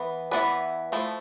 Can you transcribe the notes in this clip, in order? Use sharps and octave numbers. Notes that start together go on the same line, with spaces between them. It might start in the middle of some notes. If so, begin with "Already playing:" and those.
Already playing: E3 B3 B4
E3 B3 E4 B4 D5
F3 A3 E4